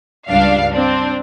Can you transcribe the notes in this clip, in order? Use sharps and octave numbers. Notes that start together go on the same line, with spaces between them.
C#2 G2 D4 F5
C4 D4